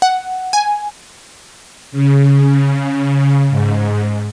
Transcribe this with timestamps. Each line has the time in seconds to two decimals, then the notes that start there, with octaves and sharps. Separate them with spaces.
0.02 F#5
0.53 G#5
1.92 C#3
3.50 G#2